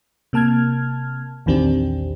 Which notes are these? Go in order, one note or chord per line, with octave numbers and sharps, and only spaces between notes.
C3 A#3 A5 F6 G#6
A#1 E2 D#3 C4 D4 G4